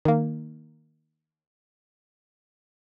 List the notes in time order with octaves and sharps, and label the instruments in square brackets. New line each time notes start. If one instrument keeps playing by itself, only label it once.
[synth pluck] D#3 A#3